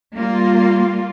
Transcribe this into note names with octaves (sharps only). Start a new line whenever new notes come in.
G3 A#3 F4